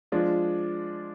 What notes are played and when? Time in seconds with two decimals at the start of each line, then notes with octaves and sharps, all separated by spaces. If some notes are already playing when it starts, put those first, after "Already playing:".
0.12 F3 G#3 D4 F4